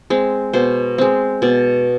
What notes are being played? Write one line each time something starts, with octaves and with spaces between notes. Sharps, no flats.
G#3 C4
B2 C5
G#3 C4
B2 D5